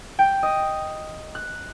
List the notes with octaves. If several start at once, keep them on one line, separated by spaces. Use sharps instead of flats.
G5
D#5
F#6